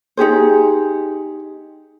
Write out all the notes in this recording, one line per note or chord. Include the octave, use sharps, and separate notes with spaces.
D#4 G4 G#4 C5